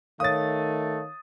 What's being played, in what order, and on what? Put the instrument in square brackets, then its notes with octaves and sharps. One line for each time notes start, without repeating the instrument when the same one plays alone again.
[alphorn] D#3 [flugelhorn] A3 [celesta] C#5 F5 [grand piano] D#6 A6